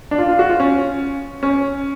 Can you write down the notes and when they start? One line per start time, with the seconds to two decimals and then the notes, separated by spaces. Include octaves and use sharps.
0.11 D4
0.18 F4
0.29 F4
0.39 F#4
0.49 F4
0.60 C#4
1.43 C#4